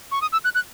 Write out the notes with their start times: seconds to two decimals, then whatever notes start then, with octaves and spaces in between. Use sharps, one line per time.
0.12 C#6
0.22 D#6
0.32 E6
0.44 F#6
0.55 F#6